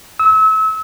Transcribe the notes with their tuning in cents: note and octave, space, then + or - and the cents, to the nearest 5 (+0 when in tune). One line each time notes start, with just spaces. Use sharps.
E6 -35